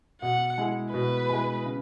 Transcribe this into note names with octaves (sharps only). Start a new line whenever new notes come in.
B2 F#5
G#3 E4 G#4
B2 B4
G#3 E4 G#4
C#3